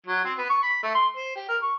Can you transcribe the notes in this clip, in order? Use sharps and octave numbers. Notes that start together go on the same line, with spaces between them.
F#3
C4
B3
C#6
B5
A3
C6
C5
G4
A#4
C#6